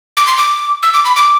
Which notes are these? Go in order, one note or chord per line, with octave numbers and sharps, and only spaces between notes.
D6
C6
D6
E6
D6
B5
D6